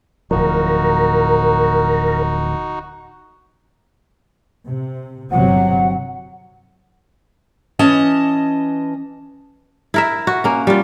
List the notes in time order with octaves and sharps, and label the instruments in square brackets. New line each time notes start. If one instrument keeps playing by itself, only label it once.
[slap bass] D1 A2 F3 [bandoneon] D#4 F#4 [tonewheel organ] A#4
[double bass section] C3
[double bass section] G1 C3 F#3 [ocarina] F#5
[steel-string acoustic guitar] E3 C#4 D#5 A5
[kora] E4 A#4 E5
F#4
A#3 C#4
G3 F4